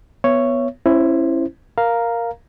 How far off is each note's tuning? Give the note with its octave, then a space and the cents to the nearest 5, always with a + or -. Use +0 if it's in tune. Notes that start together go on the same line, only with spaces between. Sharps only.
B3 +0 C#5 +0 E5 +35
C#4 -30 E4 +10 C5 +0
A#4 +0 F5 +0 A#5 +0